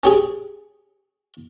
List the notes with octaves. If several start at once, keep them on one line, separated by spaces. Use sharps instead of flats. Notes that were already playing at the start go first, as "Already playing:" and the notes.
C#4 G4 G#4